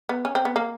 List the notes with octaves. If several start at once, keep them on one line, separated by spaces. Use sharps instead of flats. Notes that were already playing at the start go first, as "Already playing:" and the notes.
B3
C#4
C4
B3
A#3